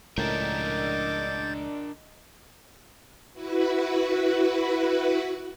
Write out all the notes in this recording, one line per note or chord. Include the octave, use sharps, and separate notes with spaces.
C#2 A2 D4 A#4 D#5 D6 G6 A6
E4 F#4 B4